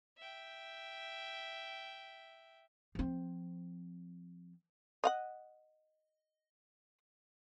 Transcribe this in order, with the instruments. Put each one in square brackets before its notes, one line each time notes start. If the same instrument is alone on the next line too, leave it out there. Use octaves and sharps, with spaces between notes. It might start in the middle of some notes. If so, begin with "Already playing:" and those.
[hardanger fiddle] E5 G5
[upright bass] F3 C4
[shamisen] D#5 F5 F#5